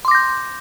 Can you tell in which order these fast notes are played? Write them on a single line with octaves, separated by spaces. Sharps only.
C6 D6 A#6 G6